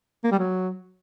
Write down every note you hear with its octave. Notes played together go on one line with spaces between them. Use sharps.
A#3
G3
F#3